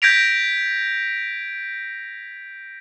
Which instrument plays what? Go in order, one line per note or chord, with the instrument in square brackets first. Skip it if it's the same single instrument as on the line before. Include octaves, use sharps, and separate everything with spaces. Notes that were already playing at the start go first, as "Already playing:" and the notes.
[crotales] G6 G#6 A#6 B6 D7 F7